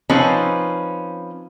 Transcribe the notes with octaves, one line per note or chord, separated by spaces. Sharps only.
F3 C4 C#4 D#4 B4